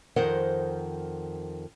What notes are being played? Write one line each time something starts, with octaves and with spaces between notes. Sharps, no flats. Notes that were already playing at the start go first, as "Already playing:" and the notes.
F2 D#3 A#4 C5 F#5